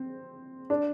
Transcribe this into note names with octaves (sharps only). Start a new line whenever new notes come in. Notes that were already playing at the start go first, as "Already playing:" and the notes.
Already playing: C4
D4